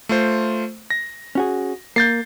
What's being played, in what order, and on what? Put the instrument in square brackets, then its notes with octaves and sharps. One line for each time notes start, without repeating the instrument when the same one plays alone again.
[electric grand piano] A3 F4 C5
A#6
[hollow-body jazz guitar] C#4 F#4 G#4
[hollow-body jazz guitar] A#3 [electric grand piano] G6 A6 C7